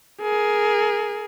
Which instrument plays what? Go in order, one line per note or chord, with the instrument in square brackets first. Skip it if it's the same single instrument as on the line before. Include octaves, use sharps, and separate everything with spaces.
[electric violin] G#4 A#4